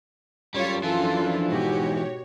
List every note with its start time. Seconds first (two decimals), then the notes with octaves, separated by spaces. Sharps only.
0.54 F#2 G3 F4 A4 C#5
0.83 F#2 E3 F3 D4 F4 A4
1.48 G#2 B2 F#4 G4 C#5